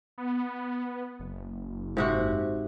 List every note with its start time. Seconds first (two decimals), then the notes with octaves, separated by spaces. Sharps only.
0.18 B3
1.20 F#1
1.97 G#2 C3 F#4